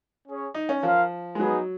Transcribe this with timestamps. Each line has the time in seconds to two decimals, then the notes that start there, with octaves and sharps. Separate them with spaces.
0.26 C#4 G#4 C#5
0.54 D#4
0.69 C#4
0.82 F3 F4 A#4 F5
1.35 G#3
1.39 F#3 B3 D#4 G#4 B4